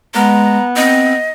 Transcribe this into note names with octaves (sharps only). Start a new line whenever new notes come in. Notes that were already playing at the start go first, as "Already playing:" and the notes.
G#3 B3 A#5
C4 D#5